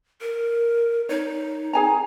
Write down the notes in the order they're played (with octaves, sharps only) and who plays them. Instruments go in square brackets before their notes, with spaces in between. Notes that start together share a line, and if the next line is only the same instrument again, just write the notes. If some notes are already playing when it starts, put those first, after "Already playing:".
[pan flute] A#4
[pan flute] D#4 [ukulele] C#5
[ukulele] G#4 G#5 A#5